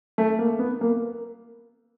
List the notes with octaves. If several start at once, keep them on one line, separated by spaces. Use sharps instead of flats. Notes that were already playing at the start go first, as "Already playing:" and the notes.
A3
A#3
B3
A#3